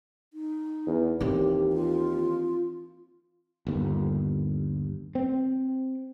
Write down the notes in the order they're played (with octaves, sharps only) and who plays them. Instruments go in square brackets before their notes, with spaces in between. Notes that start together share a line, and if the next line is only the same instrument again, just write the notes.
[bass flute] D#4
[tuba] E2
[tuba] D#2 [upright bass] E3 C4 [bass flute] G4
[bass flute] F4
[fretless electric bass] G1 D#2
C4